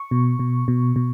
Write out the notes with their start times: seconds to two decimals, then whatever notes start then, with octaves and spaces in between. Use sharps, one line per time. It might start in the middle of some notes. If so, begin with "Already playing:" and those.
Already playing: C#6
0.11 B2
0.39 B2
0.68 B2
0.96 B2